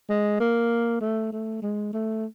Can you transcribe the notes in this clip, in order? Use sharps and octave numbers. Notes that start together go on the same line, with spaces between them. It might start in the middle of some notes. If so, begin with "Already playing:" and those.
G#3
A#3
A3
A3
G#3
A3